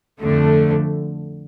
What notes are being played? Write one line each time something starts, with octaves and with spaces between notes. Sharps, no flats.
F2 D3 A3